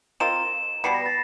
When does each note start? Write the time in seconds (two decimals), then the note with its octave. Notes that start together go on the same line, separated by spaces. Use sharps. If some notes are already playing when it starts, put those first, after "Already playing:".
0.20 C4 F4 A#4 D#5 E7
0.84 B2 G3 B3 C7
0.94 A#6
1.06 A6